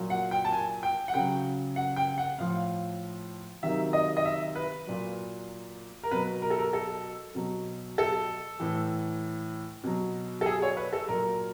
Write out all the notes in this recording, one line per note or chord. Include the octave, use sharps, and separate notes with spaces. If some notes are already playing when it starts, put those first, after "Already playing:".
Already playing: A#2 F#3
F#5
G5
A5
G#5
G5
F#5
C#3 F#3 G5
F#5
G5
F#5
A2 F3 F5
C3 D#3 F#3 E5
D#5
D#5
E5
B4
A#2 F#3
A#4
B2 F#3 B4
A#4
A4
A#4
A4
B2 F#3
A4
A2 E3
B2 F#3
A4
G#4
C#5
B4
A4
A#2 F#3 A#4